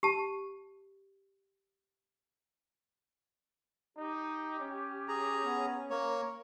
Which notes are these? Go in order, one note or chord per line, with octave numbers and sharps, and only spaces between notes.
G4 A5
D#4 G4
C#4
G#4 A#5
B3
A#3 A#4 C#5